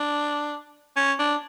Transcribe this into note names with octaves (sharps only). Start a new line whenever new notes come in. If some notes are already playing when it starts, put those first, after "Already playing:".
Already playing: D4
C#4
D4